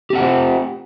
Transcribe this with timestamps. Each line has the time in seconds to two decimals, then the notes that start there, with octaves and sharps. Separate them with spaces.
0.10 G4
0.13 C4
0.15 F#5
0.18 C5
0.21 F4